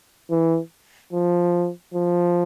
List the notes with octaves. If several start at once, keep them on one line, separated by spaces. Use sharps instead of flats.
E3
F3
F3